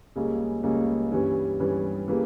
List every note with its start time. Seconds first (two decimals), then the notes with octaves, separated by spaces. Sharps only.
0.16 C#2 C#3 G3 A#3 C#4
0.63 C#2 C#3 G3 A#3 C#4
1.12 G2 E3 G3 C#4
1.60 G2 E3 G3 C#4
2.08 C#3 E3 G3 A#3